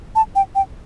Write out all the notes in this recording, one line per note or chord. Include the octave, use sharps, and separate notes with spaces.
A5
G5
G5